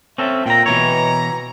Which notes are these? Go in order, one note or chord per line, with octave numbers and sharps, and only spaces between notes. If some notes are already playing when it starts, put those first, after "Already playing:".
C4 C#4 A4 E5
A#2 G5 A#5
B2 E3 C#5 A#5